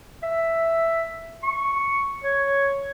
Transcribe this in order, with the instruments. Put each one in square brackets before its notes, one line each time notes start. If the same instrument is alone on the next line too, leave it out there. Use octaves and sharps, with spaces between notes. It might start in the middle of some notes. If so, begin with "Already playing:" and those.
[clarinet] E5
C#6
C#5